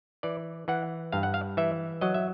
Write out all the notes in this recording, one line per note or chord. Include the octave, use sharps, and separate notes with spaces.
E3 D5
E3 F#5
G2 F5
F#5
F5
E3 E5
F#3 D#5
E5